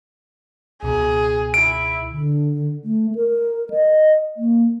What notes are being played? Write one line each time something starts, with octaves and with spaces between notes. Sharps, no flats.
C#2 B2 G#4
E4 D7
D3
A3
A#4
D#5
A#3